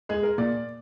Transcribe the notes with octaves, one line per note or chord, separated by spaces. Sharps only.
G#3 G#4
A#4
A#2 D5